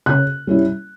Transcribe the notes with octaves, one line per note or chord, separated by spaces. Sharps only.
C#3 F#6
G3 C#4 E4